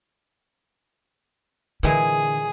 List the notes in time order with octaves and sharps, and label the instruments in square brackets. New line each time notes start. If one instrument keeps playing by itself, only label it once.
[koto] A#2 E3 G#3 [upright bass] D3 [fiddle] G#4